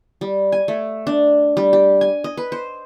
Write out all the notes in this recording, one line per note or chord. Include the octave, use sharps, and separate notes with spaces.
G3
G#5
A3
D4
G3
G4
G#5
D#5
B4
C5